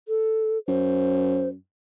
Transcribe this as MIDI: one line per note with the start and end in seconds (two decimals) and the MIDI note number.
0.08 0.58 69
0.68 1.55 42
0.68 1.48 72